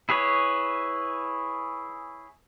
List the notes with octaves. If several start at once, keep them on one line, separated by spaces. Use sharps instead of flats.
E4 G#4 B4 C#5